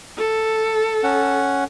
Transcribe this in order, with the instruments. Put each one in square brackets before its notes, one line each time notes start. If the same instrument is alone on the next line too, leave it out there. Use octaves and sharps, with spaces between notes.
[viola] A4
[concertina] C#4 F#5